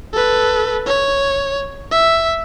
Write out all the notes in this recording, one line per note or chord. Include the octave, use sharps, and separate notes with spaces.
A4 B4
C#5
E5